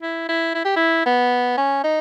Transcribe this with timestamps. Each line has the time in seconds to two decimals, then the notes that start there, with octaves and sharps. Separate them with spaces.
0.02 E4
0.29 E4
0.55 E4
0.65 G4
0.76 E4
1.06 B3
1.57 C#4
1.84 D#4